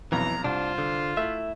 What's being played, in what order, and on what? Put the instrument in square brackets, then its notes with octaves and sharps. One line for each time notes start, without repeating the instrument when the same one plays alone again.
[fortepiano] B1 F2 B2 [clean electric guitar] E3 [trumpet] A#5
[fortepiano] C2 [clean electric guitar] D4 [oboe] F4 [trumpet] C5
[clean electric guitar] D3
[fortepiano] A3 [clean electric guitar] E4 E5